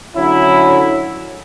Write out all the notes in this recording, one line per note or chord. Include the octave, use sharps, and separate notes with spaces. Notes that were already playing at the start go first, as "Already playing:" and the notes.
D3 F#3 C#4 E4